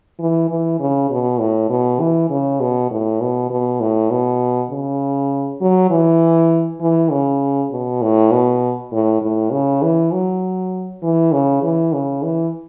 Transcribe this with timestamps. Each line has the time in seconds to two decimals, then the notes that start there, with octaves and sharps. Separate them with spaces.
0.19 E3
0.50 E3
0.80 C#3
1.11 B2
1.39 A2
1.70 B2
2.00 E3
2.30 C#3
2.60 B2
2.91 A2
3.21 B2
3.50 B2
3.80 A2
4.11 B2
4.71 C#3
5.61 F#3
5.91 E3
6.81 E3
7.11 C#3
7.72 B2
8.02 A2
8.31 B2
8.92 A2
9.22 A2
9.52 C#3
9.82 E3
10.12 F#3
11.03 E3
11.32 C#3
11.63 E3
11.93 C#3
12.23 E3